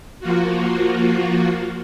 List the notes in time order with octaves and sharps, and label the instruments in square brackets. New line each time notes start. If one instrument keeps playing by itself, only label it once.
[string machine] F3 A#3 F4 F#4